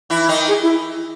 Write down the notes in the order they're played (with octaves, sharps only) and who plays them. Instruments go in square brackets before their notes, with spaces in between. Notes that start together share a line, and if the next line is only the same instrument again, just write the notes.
[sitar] E3 E4
D#3 D#4
[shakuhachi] G#4
E4